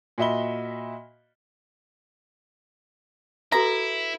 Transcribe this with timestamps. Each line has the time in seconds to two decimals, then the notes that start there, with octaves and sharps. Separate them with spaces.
0.18 A#2 F#4 D#5 E5 B5 G7
3.52 E4 F#4 A4 B4 A#5